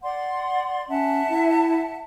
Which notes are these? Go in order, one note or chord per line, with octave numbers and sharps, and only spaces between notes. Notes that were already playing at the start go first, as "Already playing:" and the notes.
D5 F#5 C6
C#4 E5 F#5 A5
E4